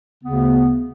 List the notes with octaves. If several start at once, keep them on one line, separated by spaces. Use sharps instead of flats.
D2 C#3 B3